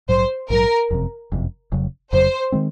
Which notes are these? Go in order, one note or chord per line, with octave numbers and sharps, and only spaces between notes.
A#1 G#2 F#3 C5
A#1 G#2 F#3 A#4
F#1 F2 C3
F#1 F2 C3
F1 F2 C#3 F#3
F1 F2 C#3 F#3 C5
D#3 G#3 C4